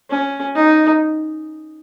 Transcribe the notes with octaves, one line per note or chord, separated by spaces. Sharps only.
C#4
D#4